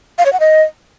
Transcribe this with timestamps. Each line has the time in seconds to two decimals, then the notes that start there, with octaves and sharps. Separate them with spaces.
0.18 F5
0.26 C#5
0.33 F#5
0.40 D#5